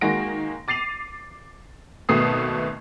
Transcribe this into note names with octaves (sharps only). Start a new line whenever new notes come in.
D#3 G#3 A#3 F#4 A#6 D7
D6 A6 C7 D#7 F7
G#1 B2 A3 B3 D#6 C7